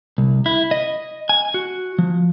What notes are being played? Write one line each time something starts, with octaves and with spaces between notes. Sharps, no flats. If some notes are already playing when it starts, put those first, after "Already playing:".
C2
E4
D#5
G#5
F#4
F3